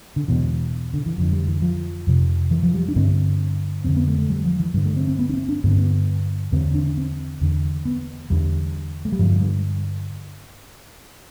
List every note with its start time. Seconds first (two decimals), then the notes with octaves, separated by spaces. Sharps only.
0.16 D3
0.28 E2 B2 E3
0.94 D3
1.06 E3
1.18 F2 D3 F3
1.32 G3
1.48 E3
1.62 F3
2.07 F2 C3
2.51 E3
2.63 F3
2.74 G3
2.88 D4
2.96 G2 D3 C4
3.84 F2 D3 C4
3.96 B3
4.08 A3
4.18 A3
4.30 G3
4.45 F3
4.60 E3
4.74 G2 D3 G3
4.86 A3
4.96 C4
5.08 C4
5.19 B3
5.29 D4
5.33 C4
5.49 D4
5.64 G2 B3
5.67 D3 C4
5.79 B3
6.52 E2 D3 C4
6.74 D4
6.87 D4
6.97 C4
7.41 E2 D3
7.85 B3
8.30 E2 D3 G3
9.05 A3
9.12 G3
9.19 G2 D3 F3
9.41 G3